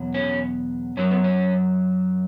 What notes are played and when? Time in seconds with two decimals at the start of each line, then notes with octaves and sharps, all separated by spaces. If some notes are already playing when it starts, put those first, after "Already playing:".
Already playing: E2 B2 F#3
0.14 C#4
0.97 F#2 F#3 C#4
1.11 B3
1.24 C#4